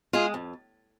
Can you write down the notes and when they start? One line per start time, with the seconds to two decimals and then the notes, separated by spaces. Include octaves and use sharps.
0.13 G#3 F4 G#4
0.34 F2